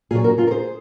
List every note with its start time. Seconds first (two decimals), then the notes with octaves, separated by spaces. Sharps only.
0.11 A#2 F4 G#4
0.15 F#3
0.24 F#4 A#4
0.38 F4 G#4
0.47 A#4
0.51 G#4 C5